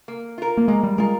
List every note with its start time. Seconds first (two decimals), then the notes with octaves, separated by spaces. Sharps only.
0.08 A#3
0.38 F4 A#4
0.57 A#3
0.68 G#3 A#3
0.83 G3
0.98 G#3 F4 A#4